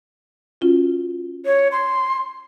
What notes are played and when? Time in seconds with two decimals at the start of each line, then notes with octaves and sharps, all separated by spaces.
0.61 C#4 F4 F#4
1.46 C#5
1.72 C6